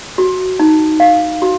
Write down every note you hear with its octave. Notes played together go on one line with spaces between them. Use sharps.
F#4
D#4
F5
F#4